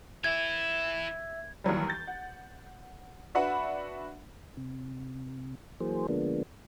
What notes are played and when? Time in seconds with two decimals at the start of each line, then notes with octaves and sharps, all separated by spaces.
0.24 E3 E4 E5 G#6
1.64 D#2 E3 F#3 G3
1.88 G6 A6
2.07 F#5
3.35 D4 F#4 B4 E5 F#5 B5
4.57 C3
5.80 E3 F#3 A#3 G#4 C5
6.08 D3 F3 G#3 A#3 B3 D4